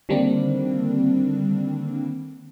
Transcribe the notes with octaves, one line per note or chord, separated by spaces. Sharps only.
D3 D#3 G3 A#3 C4 D4